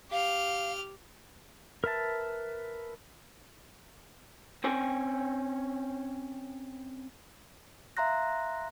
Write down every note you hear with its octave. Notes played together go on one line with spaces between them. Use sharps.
G4 F5 F6
A#4 B4 E5 A5
C4 C#4 C5 C#5 G5 G#5
E5 F5 A#5 C6 F#6 A#6